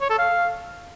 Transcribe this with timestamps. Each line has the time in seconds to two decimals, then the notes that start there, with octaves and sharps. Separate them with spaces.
0.01 C#5
0.10 A4
0.19 F5